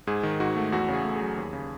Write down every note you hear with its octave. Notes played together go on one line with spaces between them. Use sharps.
G#2 G#4
D#3
G#2 F#4
A3
E2 F#4
C#3 G#4
A3
G#4
F#3
D#2
C#3